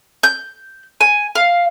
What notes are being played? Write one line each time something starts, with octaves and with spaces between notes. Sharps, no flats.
G6
G#5
F5